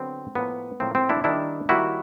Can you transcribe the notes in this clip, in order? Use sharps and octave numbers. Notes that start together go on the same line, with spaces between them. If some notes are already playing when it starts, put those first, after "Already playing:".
Already playing: D3 F#3 B3 C4
A2 F3 A#3 B3
A2 F3 A#3 C4
C4
D4 E4
D#3 G3 A#3 D4 E4
D#3 G3 A#3 E4 F#4